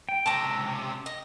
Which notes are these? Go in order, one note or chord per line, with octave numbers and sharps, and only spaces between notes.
G5
C#2 C3 A5 A#5
D#5